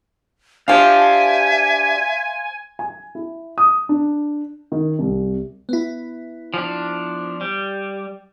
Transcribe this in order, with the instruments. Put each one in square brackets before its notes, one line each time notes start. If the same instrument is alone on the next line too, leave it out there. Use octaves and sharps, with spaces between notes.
[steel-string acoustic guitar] D4 G4 [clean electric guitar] C5 F5 [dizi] E5 [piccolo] G#5
[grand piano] G#5
E4
D#6
D4
D#3
C2
[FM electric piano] B3 E4
[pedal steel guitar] F3 D4
G3